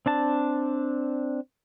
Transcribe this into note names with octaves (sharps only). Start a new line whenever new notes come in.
C4 D4 A5